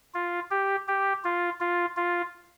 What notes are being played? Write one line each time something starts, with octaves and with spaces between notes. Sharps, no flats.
F4
G4
G4
F4
F4
F4